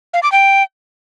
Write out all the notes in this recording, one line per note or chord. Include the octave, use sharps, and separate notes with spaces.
F5
D6
G5